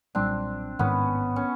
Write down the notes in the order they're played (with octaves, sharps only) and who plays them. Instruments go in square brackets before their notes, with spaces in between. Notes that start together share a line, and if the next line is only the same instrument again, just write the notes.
[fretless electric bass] B1 A#2 G3 [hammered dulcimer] C4 D4
[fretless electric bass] A1 G#2 D#3 G#3 [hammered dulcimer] B3 C#4
[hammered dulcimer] C#4